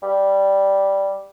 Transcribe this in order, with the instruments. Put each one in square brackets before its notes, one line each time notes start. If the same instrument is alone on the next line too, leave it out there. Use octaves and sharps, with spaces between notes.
[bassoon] G3